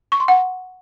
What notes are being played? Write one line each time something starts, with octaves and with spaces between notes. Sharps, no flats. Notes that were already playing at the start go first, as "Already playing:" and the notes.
C#6
C6
F#5